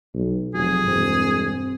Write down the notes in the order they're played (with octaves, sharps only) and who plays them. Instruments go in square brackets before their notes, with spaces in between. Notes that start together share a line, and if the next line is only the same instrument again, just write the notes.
[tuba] B1
[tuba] F1 [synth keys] F#3 [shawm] G#4
[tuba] E1 [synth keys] G2 C4